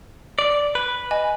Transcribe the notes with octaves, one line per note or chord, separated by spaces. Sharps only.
D5
B4
D#5 G#5